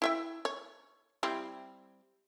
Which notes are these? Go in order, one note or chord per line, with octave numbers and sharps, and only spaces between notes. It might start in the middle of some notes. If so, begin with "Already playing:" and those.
E4 E5 G5
C#5
G3 C4 E4